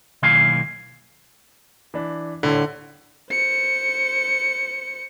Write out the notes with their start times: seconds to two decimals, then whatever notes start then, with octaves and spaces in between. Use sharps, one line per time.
0.22 B1 D#3 A#3 E4 F5 G#5
1.94 E3 D4
2.43 D#1 A2 D3
3.30 C5 C#7